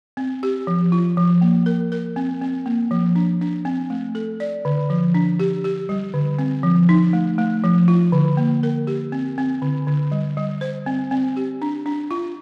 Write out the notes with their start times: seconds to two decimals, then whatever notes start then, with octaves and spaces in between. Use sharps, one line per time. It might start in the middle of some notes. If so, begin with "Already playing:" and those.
0.17 C4
0.43 G4
0.67 F3
0.92 F4
1.17 F3
1.41 A#3
1.66 A#4
1.92 A#4
2.16 C4
2.41 C4
2.66 A#3
2.91 F3
3.15 D4
3.41 D4
3.65 C4
3.90 A3
4.15 A4
4.40 D5
4.65 D3
4.90 F3
5.14 D4
5.40 G4
5.64 G4
5.89 G3
6.14 D3
6.38 C4
6.63 F3
6.89 D#4
7.13 A3
7.38 A3
7.64 F3
7.88 F4
8.12 D3
8.37 A#3
8.63 A#4
8.87 G4
9.12 C4
9.38 C4
9.62 D3
9.87 D3
10.12 G3
10.37 G3
10.61 C5
10.86 C4
11.11 C4
11.37 G4
11.62 D4
11.86 D4
12.11 F4